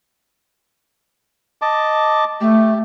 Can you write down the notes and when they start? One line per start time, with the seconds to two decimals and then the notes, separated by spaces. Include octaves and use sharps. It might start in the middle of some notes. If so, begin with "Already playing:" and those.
1.62 D#5 A5 D6
2.41 A3 G4